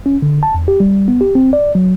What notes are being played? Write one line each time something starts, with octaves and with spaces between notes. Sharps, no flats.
C#4
D3
A5
E2
G4
G3
B3
G4
C4
D5
F#3